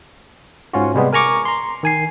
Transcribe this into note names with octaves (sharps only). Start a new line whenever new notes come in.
G#2 C#4 F4 F#4
C3 G3 G#3 B3
A#4 G#5 A#5 C#6 D6
A#5 C6
D#3 G#5 C7